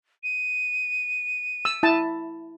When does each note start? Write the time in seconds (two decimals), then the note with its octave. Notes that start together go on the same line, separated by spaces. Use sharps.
0.24 D#7
1.65 E6
1.83 E4 A5